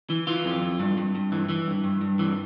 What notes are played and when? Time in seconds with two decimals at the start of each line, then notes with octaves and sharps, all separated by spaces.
0.10 E3
0.27 E3 F4
0.45 F2
0.62 F2
0.80 G2
0.97 G2
1.15 G2
1.32 E3
1.49 E3
1.67 G2
1.84 G2
2.01 G2
2.19 E3